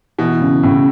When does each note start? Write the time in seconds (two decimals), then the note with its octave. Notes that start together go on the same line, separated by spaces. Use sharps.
0.18 B2 E3
0.41 C#3
0.63 A2 C#3